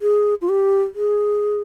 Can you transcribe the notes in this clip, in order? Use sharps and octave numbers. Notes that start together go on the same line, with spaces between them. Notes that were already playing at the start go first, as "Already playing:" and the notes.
G#4
F4
G4
G#4